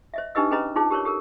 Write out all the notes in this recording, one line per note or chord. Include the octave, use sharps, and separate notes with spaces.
C5 D#5 E5
D4 D#4 G4 B4 D#5 E6
C#4 G#4 B4 C5 D#5 A#5
D#4 F4 G#4 C5 A5
G4 A#4 C5 C#5
G4 A4 A#4